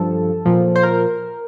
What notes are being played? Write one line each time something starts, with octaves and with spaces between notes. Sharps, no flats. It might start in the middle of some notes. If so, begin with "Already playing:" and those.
Already playing: G2 F3 A4
A#2 F3
C5
A#4